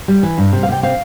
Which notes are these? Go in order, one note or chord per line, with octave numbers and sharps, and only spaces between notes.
G3
E3
G2
C3
F5
C3 G5
C4 F5